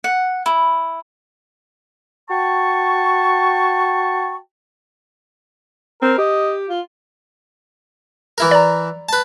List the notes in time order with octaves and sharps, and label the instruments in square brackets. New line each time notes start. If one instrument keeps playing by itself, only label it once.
[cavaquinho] F#5
E4
[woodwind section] F#4 G5 A5 C#6
[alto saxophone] C4 [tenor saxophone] A#4
[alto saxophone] G4 [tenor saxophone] D#5
[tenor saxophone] F4
[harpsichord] E3 E4 A#4
[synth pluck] D5 A#5
[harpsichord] B4 A5